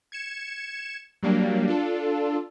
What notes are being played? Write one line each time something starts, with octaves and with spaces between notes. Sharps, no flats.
G#6 C#7 E7
F#3 G3 A#3 D4
D4 F4 A4